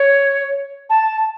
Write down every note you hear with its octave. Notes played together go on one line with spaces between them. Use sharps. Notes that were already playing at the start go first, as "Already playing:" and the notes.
Already playing: C#5
A5